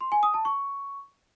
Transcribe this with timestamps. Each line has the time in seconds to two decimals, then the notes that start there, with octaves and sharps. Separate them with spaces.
0.01 C6
0.12 G#5
0.23 D#6
0.34 A5
0.45 C#6